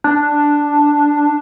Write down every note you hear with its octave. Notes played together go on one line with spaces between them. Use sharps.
D4